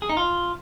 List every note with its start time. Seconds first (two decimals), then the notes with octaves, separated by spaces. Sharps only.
0.02 G#4
0.09 D#4
0.17 F4